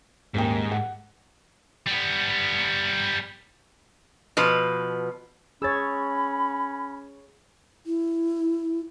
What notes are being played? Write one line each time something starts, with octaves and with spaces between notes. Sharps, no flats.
D#1 G#2 A#3 G5
F#5
G3 B3
B2 F3 B4
C#4 G#4 C#5 B5 E6 G#6 A6
E4